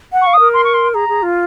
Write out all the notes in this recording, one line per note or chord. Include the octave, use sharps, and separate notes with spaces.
F#5
F5 C#6
D#6
A#4
C6
C#6
C6
G#4 A#5
G#4
F4